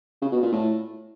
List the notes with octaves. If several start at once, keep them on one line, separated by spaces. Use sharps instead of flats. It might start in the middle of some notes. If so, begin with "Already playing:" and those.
C#3
B2
A#2
A2